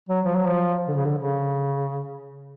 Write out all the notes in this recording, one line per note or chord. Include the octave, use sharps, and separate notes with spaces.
F#3
F3
F#3
F3
D3
C#3
D3
C#3